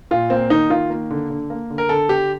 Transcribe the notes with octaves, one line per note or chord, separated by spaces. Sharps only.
A#2 F4
A#3 C4
D#3 D#4
D#3 F4
A#3
D3
D3
A#3
D3
A#4
D3 A4
D3 G4